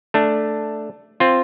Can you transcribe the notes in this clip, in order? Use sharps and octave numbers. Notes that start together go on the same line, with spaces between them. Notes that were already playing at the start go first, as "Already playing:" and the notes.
A3 D4
C4 F4